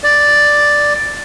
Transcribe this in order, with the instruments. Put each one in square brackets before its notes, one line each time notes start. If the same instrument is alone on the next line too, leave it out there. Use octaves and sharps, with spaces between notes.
[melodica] D5